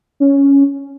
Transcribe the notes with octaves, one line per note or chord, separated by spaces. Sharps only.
C#4